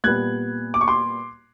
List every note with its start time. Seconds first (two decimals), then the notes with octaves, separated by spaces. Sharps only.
0.04 A#2 G3 B3 F#6 G#6
0.74 D6
0.81 C#6
0.88 C6 D6